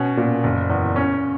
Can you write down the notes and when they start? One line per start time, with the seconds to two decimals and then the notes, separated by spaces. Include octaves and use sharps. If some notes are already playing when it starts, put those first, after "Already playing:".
Already playing: B2 C#4
0.17 A#2
0.44 F#1
0.70 E2
0.96 C#4